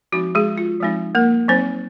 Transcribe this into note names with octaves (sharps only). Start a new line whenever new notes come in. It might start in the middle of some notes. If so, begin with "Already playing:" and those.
F3 G#3 C4 D#4 F#4
G#3 G#4
F4
F3 G#3 C4 D#4
A#3 A#4
F#3 C4 D#4 C5